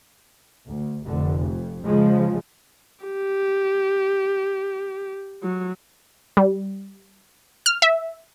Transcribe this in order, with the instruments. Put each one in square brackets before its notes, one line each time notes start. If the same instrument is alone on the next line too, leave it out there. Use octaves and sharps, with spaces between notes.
[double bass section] D2
F1 D3
F2
C#3 F3 G#3
[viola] G4
F#3
[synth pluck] G3
F6
E5